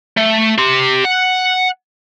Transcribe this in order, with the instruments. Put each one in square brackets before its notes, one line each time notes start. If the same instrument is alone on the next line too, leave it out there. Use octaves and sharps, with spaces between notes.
[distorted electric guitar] A3
G4 C6
F#5